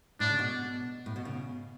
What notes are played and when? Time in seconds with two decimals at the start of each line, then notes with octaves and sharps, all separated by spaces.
0.20 A2 D4
0.30 C#3
0.39 B2
1.06 A2
1.16 B2
1.25 C#3